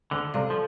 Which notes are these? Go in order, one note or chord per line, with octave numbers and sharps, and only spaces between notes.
D2 D3
C2 C3 A4 D5 F5
F3